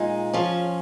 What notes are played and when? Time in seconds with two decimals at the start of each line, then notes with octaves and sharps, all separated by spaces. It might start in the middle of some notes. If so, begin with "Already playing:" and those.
Already playing: A#2 G#3 D#4
0.33 F3 C#4